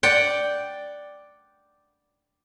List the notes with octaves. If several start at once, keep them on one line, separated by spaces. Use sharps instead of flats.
D5 F#5 G5